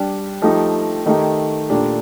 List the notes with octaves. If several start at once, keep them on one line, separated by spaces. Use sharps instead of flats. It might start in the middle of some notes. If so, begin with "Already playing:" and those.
Already playing: G3 D4 G4
F3 A3 D#4 G4
D#3 A3 D#4 G4
A#2 A3 D4 G4